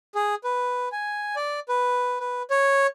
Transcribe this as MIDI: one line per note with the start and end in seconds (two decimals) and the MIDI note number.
0.15 0.35 68
0.44 0.89 71
0.92 1.35 80
1.36 1.60 74
1.69 2.20 71
2.20 2.42 71
2.50 2.87 73